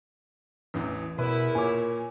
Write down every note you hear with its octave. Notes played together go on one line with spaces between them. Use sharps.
A1 E2 E3
E2 B2 E4 A#4 B4
A#2 C#5 G#5 D6